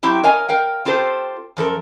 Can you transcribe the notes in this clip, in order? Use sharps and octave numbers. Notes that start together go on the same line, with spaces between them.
F#3 C4 E4 G4
A#4 C#5 D#5 F5 G#5
A#4 F5 G5
C4 F4 G4 A4 C5
F#2 F3 A4 A#4